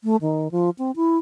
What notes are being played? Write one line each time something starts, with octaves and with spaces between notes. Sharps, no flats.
A3
D#3
F3
C4
E4